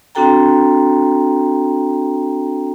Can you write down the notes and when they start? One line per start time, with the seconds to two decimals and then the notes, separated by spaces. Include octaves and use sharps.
0.15 C4 D4 F#4 A4 G5 A#5